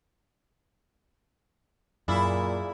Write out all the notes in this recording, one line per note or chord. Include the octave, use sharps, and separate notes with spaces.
F#2 A#2 E4 G#4 D5 F5